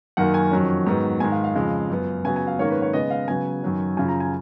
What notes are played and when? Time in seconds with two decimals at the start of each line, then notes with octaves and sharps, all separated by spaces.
0.17 F#2 D#3 F#3 A#3 F#5
0.34 G#5
0.51 F2 D#3 F#3 C#4
0.86 G#2 D#3 F#3 B3
1.20 G#2 D#3 G#3 G#5
1.32 F5
1.44 F5
1.55 F2 C#3 G#3
1.90 F#2 F3 B3
2.24 C#3 F#3 B3 G#5
2.36 G#5
2.47 F5
2.59 G#2 D#3 A#3 C#4 C#5
2.70 B4
2.82 C#5
2.93 C#3 G#3 B3 D#5
3.10 F5
3.28 C#3 F#3 B3 G#5
3.63 F#2 D#3 F#3 C#4
3.97 F#2 C#3 F3 G#5
4.08 A#5
4.20 G#5